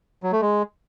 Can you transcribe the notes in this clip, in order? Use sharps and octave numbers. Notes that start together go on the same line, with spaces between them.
F#3
A3
G#3